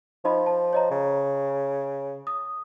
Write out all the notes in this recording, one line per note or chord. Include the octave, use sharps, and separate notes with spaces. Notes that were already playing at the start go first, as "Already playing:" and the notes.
F3 D#4 D#5 B5
A5
C#5 D#5 A#5
C#3
D#6